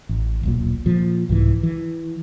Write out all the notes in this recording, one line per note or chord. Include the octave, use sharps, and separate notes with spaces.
A1
D#1 B1 A#2
A#2 F3
C2 G#2 E3
E3